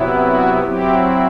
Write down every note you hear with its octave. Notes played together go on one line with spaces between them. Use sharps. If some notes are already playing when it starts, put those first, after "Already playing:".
Already playing: C3 F#3 B3 E4
F#4
F#3 C4 E4 G4